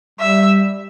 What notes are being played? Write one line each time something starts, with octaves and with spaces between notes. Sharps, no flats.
G3 E5